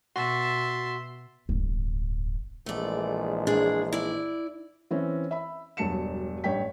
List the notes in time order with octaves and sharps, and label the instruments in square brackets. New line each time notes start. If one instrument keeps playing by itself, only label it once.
[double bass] B2 [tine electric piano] F#4 [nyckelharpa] E5 A5 [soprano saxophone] C6
[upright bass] D1 G1
[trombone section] A#1 E3 G#3 [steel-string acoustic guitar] A3 D5
[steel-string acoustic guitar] D4 G#4
E4 D5
[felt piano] E3 C4 C#4
E5 B5
E1 G2 F#3 A5 C#7 E7
A1 G2 C#5 G5 B6